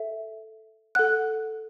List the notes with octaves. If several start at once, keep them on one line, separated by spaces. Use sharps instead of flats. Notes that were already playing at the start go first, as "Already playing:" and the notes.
Already playing: A4 E5
A4 F#5 F#6